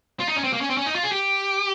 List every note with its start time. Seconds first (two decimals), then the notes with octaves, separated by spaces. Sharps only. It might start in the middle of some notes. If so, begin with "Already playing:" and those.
0.20 F4
0.28 D#4
0.36 C#4
0.44 C4
0.53 A#3
0.61 C#4
0.70 C4
0.77 C#4
0.86 D#4
0.95 F4
1.04 G#4
1.12 G4